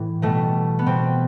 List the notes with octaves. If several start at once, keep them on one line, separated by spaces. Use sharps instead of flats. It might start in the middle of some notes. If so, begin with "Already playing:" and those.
Already playing: A2 E3
B2 G3 A3
B3
B2 G3 C4